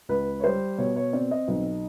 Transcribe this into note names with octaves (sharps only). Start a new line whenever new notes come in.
C#2 B4
C#5
G3 C5
B2 C#5
C#5
C4 D5
D#5
B1